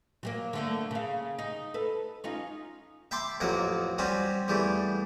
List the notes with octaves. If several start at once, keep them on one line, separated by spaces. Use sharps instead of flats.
F#3 G3 A#3
D3 A3 A#3
C#3 F5
D#4
A4 B4
C#4 D#4 F4
E5 G5 A5 B5 C6 D6
A1 F2 F#3 A#3 F#5
G3 C4 C#4 F#4 G4
E2 E3 G3 A3